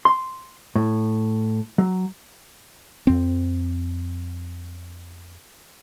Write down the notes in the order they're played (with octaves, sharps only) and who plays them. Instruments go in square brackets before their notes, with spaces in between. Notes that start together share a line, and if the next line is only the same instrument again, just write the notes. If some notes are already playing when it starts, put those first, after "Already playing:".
[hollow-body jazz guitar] C6
A2
F#3
[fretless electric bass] F2 C4